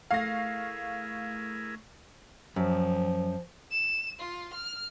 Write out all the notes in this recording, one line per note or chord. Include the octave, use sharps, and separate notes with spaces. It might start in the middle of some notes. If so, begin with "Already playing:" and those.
A3 E4 G#4 A#4 F5 C#6 A#6 C7
F#2 F3
E7
F4
F6